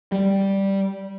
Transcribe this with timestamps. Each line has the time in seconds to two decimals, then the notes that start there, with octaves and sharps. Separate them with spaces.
0.12 G3